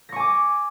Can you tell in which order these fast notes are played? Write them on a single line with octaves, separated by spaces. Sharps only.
A#6 C#6 G#5 D6